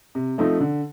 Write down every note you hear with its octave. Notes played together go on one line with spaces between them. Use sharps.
C3
F3 A3 C4 D#4
D3